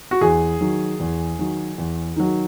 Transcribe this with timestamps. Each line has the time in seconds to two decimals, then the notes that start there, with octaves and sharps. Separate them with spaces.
0.11 F#4
0.21 E2 G#4
0.61 D#3 F#3
1.00 E2
1.39 D#3 F#3
1.78 E2
2.16 D#3 F#3